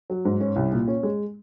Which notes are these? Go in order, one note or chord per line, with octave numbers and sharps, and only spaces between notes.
F#3
G#2
C#4
C2
A#2
C#4
G#3